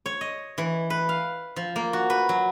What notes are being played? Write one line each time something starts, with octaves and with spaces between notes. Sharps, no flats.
C#5
D#5
E3
B4
F5
F3
A#3
F#4
B4
F#3